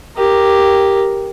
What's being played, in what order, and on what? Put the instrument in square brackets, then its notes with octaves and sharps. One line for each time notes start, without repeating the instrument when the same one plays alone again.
[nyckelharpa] G4 A#4